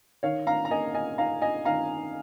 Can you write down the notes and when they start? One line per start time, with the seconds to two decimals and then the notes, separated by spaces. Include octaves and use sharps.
0.23 D#3 C#5 F5
0.47 F5 A#5
0.65 A#5
0.71 A#3 D#5 G#5
0.94 D#5 G#5
1.18 D#4 F5 A#5
1.42 D#5 G#5
1.65 D#3 F5 A#5